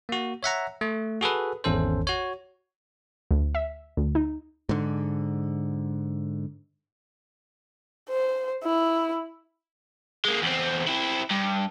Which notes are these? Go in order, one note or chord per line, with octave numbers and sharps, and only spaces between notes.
A#3 F#4
C#5 E5 F#5 A#5
A3
F#4 G#4 A4 B4
G#1 E2 C#4 A4 C5
F#4 C#5
D2
E5
D2
D#4
G#2 D3
C5
E4
G#3 A#3
E2 C4
C4 E4
G2